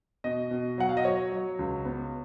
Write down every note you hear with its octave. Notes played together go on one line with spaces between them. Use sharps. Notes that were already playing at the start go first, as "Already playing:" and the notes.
B2 D#5
B2
F#3 F#5
F5
D#5
F#3 C#5
F#3
C#2
B3